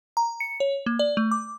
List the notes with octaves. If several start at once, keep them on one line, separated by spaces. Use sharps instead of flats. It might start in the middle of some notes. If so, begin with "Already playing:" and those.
A#5
C#7
C#5
A#3
D5
A3
D6